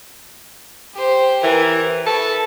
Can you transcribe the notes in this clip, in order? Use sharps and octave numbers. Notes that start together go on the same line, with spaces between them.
G4 C5
E3 A#4
A4 B4 C#6